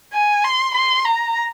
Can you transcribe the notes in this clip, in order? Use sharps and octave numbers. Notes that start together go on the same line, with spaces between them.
G#5
C6
C6
A#5